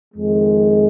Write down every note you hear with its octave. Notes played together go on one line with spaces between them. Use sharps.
F2 D#3 G#3